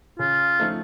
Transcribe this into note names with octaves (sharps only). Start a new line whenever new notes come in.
C#3 F4
F3 A3 D#4